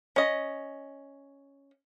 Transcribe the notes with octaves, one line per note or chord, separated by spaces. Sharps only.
C#4 D#5